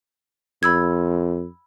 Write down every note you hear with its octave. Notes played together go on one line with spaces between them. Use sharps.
F2 B5 E6 G#6